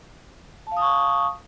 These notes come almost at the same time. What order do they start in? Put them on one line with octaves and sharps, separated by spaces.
A5 F5 D#6 C#6